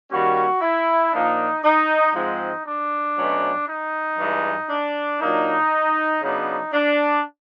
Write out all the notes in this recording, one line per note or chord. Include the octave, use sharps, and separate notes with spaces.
D#3 G3 A#3 C#4 F#4
E4
A#2 F3 A#3 D4 D#4
D#4
G#2 F3 G#3 C4 D#4
D4
B2 F#3 A3 C#4
D#4
G2 E3 G#3
D4
A#2 F#3 A#3 D4 D#4
C#3 F#3 B3 D4 D#4
D4